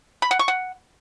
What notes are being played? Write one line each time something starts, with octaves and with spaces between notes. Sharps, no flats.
B5
F#5
C#6
F#5